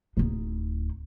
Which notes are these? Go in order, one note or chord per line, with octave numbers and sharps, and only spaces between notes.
D1 D#4